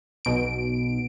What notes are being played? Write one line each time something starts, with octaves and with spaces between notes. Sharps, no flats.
B1 B2 D7